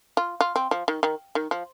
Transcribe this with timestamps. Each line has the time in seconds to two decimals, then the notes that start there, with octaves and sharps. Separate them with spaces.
0.17 F4
0.41 F4
0.56 C4
0.71 F3
0.88 D#3
1.03 D#3
1.35 D#3
1.51 F3